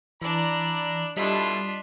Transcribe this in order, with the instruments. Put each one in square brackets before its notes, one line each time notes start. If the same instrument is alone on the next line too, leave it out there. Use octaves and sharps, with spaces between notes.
[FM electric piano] E3 [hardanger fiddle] D4 D5 [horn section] E4 A#5
[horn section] B2 E4 A4 [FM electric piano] G3 D#5 B6 [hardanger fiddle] D4 F4